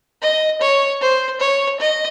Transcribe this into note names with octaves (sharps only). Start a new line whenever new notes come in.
D#5
C#5
C5
C#5
D#5